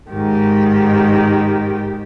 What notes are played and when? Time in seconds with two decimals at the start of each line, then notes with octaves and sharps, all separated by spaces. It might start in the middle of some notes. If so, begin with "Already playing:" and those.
0.12 G#2 D#3 G4